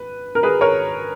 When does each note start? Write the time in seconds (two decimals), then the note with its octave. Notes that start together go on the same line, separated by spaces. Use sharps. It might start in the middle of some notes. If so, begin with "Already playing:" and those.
Already playing: B4
0.35 A#4
0.43 G#4 B4
0.61 A#4 C#5